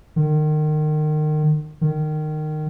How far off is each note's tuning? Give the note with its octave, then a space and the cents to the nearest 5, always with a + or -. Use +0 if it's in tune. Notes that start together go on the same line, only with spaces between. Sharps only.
D#3 -30
D#3 -20